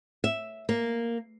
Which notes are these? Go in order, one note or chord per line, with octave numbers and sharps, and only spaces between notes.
E5
A#3